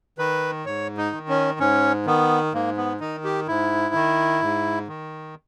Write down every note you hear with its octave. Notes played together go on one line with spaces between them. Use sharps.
D#3 B4
G#2 C#5
D#4
D#3
C#4
G#2 C#4
D#3 B3
G#2 A#3
B3
D#3 D#4
G4
G#2 E4
D#3
G#2
D#3